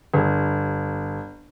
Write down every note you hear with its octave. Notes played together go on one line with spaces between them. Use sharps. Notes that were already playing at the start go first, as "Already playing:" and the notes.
G1